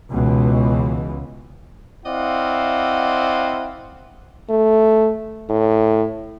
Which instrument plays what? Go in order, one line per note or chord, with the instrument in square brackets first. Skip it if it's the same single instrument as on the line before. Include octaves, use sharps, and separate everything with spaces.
[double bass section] C#2 B2 E3
[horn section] C4 E4 D5 D#5 F5 F#5
[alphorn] A3
A2